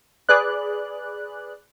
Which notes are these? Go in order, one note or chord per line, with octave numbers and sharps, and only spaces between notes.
G#4 B4 D5 F#6